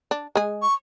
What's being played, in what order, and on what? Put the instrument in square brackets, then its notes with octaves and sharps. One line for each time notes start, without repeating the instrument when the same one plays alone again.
[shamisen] D4
G#3 G#4
[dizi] C#6